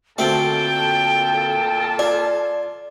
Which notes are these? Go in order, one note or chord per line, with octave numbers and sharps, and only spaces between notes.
D2 A#2 A3 C4 A4 G5 A5
F4 D5